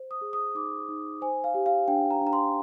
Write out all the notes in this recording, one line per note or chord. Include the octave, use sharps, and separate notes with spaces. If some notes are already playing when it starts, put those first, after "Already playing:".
Already playing: C5
D#6
G#4
D#6
D#4 D6
D#4
C5 G#5
F5
G4
F5
D4 G5
A#5
D4
A#5
C6